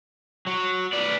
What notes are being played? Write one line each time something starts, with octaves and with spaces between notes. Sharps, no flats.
F#3
B3 D5